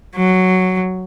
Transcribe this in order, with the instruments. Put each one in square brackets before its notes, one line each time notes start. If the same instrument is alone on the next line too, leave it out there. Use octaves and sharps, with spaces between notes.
[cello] F#3